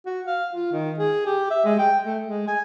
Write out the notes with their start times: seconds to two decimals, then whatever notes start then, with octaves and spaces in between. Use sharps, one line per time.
0.06 F#4
0.27 F5
0.53 F4
0.72 D#3
0.98 G#4
1.26 G4
1.51 E5
1.65 G#3
1.79 G5
2.05 A3
2.26 G#3
2.48 G#5